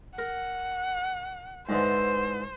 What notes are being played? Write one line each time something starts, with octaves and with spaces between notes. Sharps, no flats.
A#4 F#5
G#2 D3 E3 C5